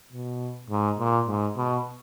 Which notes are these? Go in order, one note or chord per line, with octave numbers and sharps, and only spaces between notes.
B2
G#2
A#2
G#2
B2